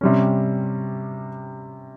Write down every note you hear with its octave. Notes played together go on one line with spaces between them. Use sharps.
C3 G3 C#4